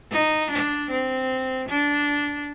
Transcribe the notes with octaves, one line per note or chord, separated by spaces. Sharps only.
D#4
D4
C4
D4